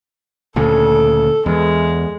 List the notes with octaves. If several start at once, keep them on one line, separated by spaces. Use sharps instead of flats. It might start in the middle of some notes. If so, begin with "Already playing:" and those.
D2 A#2 C#3 A4
E2 G#3